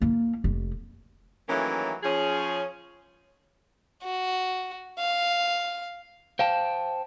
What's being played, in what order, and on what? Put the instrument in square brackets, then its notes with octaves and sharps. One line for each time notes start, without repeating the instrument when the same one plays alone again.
[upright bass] A#3 E4
F1
[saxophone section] D#3 E3 F#3 A3 A#3 C#4
F3 C#4 G#4
[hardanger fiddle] F#4
F5
[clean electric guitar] C5 G5 A5 [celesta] F5